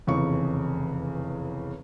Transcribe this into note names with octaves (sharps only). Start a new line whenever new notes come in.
F1 E2 C#3 C#6